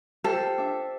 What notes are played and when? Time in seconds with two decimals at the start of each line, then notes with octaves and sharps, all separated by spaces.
0.24 F4 G4 A4 C5
0.58 D4 E5